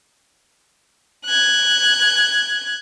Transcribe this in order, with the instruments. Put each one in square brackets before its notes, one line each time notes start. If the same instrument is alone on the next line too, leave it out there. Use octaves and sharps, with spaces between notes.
[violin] F#6 G#6